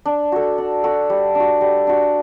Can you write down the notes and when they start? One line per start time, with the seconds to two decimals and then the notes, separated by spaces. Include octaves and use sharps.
0.05 D4
0.32 F#4 A4
0.58 D4
0.84 F#4 A4
1.10 G3
1.35 D4 F#4
1.61 G3
1.87 D4 F#4